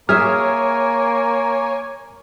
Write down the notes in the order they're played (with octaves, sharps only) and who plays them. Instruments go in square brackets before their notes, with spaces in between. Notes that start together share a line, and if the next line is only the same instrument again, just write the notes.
[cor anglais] A#3 [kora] G#4 E5 [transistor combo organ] C#5 G#5 [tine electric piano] F6